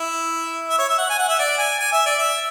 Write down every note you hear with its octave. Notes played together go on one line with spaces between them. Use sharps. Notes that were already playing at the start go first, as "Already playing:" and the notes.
Already playing: E4
E5
C#5
E5
F#5
G#5
F#5
E5
D5
G#5
G#5
E5
D5
E5